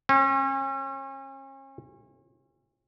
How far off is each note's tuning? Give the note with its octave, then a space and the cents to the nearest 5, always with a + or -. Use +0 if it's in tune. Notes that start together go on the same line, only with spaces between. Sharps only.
C#4 -40